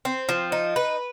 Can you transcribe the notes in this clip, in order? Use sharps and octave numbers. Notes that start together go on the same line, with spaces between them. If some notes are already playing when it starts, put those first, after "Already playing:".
C4
F3
D#4
B4